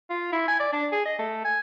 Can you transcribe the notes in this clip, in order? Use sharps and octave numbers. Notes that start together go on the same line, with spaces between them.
F4
E4
G#5
D5
D4
G#4
D#5
A3
G#5